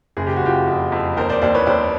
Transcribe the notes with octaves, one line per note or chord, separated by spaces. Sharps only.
F#1 G#4
G4
F#4
F#1 F4 G4
F2
F2
D#2 A#4 C5
C5 D5
D#2 C5 D5
B4 C#5
D#2 C5 D5